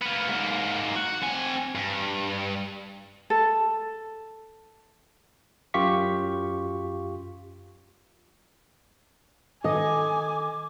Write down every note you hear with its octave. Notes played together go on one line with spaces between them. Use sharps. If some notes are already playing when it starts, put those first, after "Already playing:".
A#3 B3
G#2 A#3
F#4
C4 G#5
G2
A4
F#2 F4 G4 F5 C#6 B6
D#3 A4 D#5 G#5 D6 D#6